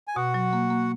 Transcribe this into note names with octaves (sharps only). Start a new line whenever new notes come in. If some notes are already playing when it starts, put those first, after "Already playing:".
G#5
B2 F#4 F#5
F#3
A#3
A#3